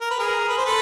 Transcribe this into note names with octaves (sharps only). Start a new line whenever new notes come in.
A#4
B4
G#4 A#4
B4
C5
A4 B4